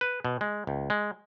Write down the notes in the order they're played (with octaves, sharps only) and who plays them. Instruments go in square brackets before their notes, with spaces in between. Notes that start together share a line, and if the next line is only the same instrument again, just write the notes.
[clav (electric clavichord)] B4
B2
G#3
C#2
G#3